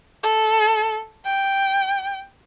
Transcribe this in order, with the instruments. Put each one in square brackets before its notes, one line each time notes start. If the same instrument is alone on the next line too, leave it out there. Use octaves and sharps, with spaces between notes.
[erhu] A4
G5